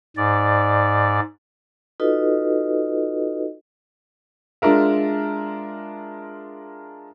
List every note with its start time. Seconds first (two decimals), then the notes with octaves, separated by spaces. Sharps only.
0.17 G#2 D5
2.00 D#4 F4 F#4 A4 B4 D#5
4.62 G#3 D4 F4 A#4 E5